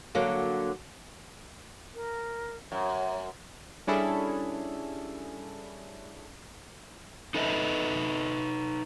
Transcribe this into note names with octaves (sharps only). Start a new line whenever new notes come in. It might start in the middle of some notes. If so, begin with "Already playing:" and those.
D3 F#3 A#3
A#4
F#2 C#5
G3 C#4 D4 E4 G#4 A4
D#4 A4 B4 D#5 E5